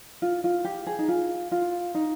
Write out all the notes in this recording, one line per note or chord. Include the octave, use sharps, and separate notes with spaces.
F4
F4
G4
G#4
D#4
F4
F4
D#4